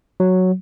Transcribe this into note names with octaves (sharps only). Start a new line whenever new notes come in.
F#3